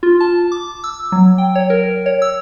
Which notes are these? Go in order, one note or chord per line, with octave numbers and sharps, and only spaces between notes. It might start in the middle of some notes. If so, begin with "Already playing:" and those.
F4
A5
D6
E6
F#3
G5
C#5
A#4
C#5
E6